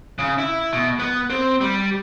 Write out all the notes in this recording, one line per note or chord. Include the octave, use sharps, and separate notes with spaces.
C#3
E4
B2
B3
C4
G3